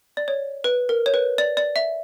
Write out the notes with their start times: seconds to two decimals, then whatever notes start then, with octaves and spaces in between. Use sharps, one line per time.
0.17 D5
0.28 C#5
0.64 B4
0.89 A#4
1.06 C#5
1.14 B4
1.38 D5
1.57 D5
1.76 E5